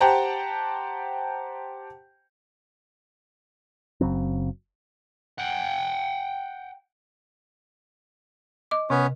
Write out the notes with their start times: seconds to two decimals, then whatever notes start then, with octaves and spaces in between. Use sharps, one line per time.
0.01 G4 C5 F#5 G5 A5 A#5
4.01 F#1 C#3 F#3 C4
5.38 F#5 G5
8.71 D#5 D6
8.90 C3 B3 C#4